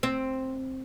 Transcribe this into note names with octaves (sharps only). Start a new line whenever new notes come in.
C4